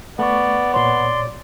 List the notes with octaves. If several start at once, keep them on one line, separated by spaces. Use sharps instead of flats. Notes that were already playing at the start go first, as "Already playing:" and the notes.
A3 B3 D5 C#6
A#2 C#5 D5 C6